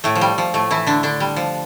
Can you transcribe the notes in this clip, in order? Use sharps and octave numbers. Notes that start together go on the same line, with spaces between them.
A2 A3
F3
G3
F3
A2 A3
E3 E4
D3 D4
D3 D4
G3
F3